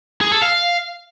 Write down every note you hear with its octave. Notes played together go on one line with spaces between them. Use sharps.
G#4
A4
F5